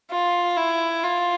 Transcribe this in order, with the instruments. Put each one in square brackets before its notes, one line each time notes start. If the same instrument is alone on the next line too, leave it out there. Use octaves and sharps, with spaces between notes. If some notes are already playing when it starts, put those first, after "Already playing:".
[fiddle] F4
E4
F4